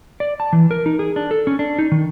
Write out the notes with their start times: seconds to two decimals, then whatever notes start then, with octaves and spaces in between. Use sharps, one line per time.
0.20 D5
0.40 A5
0.53 E3
0.71 A#4
0.86 D#4
0.99 G#4
1.16 D4
1.31 A4
1.47 C#4
1.59 D4
1.79 D#4
1.92 D#3